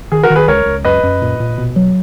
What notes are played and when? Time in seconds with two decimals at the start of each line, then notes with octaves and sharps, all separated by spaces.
0.12 D#3 G#4
0.23 F#4 A#4
0.30 D#3
0.36 G#4 B4
0.48 C#2 A#4 C#5
0.66 C#2
0.85 F#2 B4 D#5
1.03 F#2
1.22 A#2
1.40 A#2
1.58 B2
1.76 F#3